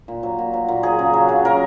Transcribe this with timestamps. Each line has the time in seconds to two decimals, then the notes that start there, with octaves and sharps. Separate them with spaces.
0.08 A#2
0.23 F#3
0.39 A#2
0.53 F#3
0.68 A#2
0.83 F#3 G#4
0.99 C#3
1.13 F#3
1.29 C#3
1.45 F#3 A#4